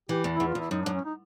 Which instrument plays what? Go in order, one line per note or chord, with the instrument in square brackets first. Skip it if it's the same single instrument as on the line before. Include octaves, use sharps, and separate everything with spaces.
[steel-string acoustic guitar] E3 [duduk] G4
[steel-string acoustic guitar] E2
[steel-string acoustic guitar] E2 [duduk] E4
[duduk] F4
[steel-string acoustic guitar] E2 [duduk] E4
[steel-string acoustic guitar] F#2 [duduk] D#4
[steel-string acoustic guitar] F#2 [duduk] D4
[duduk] C#4
D#4